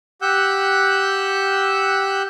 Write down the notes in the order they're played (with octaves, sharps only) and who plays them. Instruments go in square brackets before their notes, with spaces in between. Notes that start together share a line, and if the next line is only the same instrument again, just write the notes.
[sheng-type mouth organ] G4 F#5 E6 F#6 G6